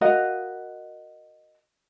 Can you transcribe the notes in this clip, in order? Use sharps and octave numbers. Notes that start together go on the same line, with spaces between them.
F#4 A#4 D#5 F5